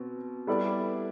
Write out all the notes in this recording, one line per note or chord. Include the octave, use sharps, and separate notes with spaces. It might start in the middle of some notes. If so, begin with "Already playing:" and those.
Already playing: B2 C4
G3 B3 E4 A4 D5